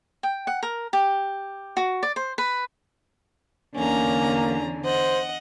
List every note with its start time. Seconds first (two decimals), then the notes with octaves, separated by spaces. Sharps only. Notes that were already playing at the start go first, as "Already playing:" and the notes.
0.23 G5
0.47 F#5
0.63 A#4
0.93 G4
1.77 F#4
2.03 D5
2.16 C5
2.38 B4
3.76 E2 D3 A#3 C#4 A#5
4.85 C5 D#5 F#5